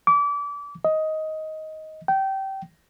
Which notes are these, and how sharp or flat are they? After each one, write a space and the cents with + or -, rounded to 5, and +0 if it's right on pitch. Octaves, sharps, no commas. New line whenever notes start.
D6 -30
D#5 +10
G5 -20